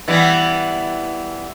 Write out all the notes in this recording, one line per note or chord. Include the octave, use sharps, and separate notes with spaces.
E3 G3 B3